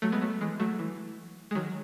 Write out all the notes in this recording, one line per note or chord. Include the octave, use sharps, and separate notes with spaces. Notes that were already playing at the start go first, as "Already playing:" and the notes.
F#3 A3
G#3 B3
F#3 A3
E3 G#3
F#3 A3
E3
G#3
D#3 F#3